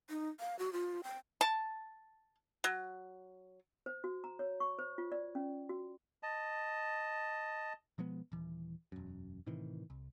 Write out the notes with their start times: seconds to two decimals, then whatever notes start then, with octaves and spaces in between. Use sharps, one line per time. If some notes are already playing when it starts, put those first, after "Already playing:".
0.10 D#4
0.40 F5
0.59 F#4
0.73 F4
1.04 G5
1.41 A5
2.64 F#3
3.86 C5
4.04 F#4
4.24 A#5
4.39 C#5
4.60 C#6
4.79 C5
4.98 F4
5.12 D5
5.35 C#4
5.69 F#4
6.23 D#5 A5
7.98 B2 F3 G#3 B3
8.32 D#1 E3
8.92 E1 F#2
9.46 A2 C3 D#3 E3
9.90 C2